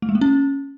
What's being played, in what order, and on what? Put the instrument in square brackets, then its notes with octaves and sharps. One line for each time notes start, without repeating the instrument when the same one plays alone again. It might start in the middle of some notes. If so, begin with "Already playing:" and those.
[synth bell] A3
G#3
A#3
C#4